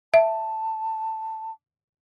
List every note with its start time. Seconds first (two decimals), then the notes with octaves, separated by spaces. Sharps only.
0.14 E5 A5